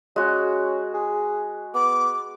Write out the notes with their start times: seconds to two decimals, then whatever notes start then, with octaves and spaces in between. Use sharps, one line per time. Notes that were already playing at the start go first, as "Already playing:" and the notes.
0.16 G#3 C#4 F#4
0.94 G#4
1.75 B3 D6